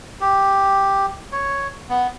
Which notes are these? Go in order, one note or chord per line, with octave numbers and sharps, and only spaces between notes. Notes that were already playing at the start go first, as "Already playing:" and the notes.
G4
C#5
B3